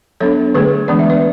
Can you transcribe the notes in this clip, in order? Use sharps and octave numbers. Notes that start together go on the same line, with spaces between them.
F#3 B3 D4 A4 C#5
D3 F#3 A3 G#4 B4
E3 G#3 B3 D4 D5
E5
B4 D5